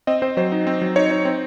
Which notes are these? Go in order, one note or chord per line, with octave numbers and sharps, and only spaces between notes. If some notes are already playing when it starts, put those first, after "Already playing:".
C4 D#5
C4 C5
F#3 C5
D#4
C4
F#3
D#4 C#5
D#4
C4